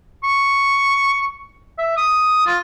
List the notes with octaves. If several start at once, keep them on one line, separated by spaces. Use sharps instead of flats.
C#6
E5
D#6
F4